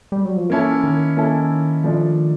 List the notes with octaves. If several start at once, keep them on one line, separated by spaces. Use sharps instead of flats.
G3
F#3
F3
E3 A#3 C#4 E4 A4
D#3
A#3 C#4 E4 A4
F3 A3 D4 F4